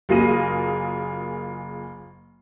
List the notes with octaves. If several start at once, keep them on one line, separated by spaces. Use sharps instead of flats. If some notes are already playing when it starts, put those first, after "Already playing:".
F#1 A#3 F4 G#4 A#6 D#7